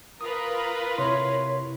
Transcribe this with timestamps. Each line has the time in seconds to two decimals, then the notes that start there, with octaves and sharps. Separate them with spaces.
0.21 F4 A#4 B4 D#6
0.98 C3 E4 C#5 C6